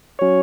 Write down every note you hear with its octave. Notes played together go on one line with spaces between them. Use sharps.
F#3 C#4 C#5